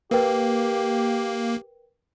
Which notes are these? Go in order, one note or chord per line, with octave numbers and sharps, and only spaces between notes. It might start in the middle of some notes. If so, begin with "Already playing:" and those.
A#3 G4 A#4 B4 G5